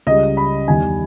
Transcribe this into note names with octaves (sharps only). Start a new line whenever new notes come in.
C#2 C#3 G3 D#5
B5
E2 D#3 G3 G#5